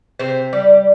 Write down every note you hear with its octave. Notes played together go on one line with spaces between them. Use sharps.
C3 C5
G3